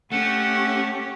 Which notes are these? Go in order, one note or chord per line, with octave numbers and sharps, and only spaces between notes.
A3 C#4 G4 F#5